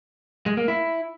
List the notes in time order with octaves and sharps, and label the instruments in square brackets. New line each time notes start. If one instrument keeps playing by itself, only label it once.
[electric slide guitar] G#3
A#3
E4